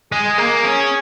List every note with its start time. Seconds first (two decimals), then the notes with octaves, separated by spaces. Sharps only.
0.12 G#3 G#4
0.38 A#3
0.65 C#4